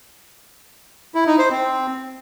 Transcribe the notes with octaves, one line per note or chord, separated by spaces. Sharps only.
E4
D#4
C5
C4